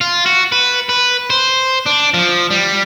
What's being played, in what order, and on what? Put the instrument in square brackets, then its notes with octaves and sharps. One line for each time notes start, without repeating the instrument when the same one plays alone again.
[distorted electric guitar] F4
F#4
B4
B4
C5
D4
F3
G3